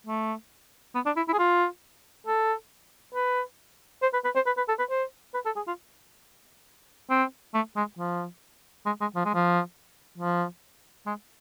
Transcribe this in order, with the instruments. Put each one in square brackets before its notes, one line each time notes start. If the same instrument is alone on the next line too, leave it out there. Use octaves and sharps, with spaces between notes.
[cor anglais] A3
B3
D4
E4
E4
G#4
F4
A4
B4
C5
B4
B4
C5
B4
B4
A4
B4
C5
B4
A4
G#4
F4
C4
A3
G#3
F3
G#3
G#3
F3
G#3
F3
F3
G#3